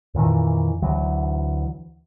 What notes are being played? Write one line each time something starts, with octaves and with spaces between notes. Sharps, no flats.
F2 A#2 D#3 E3
D2 E3 F#3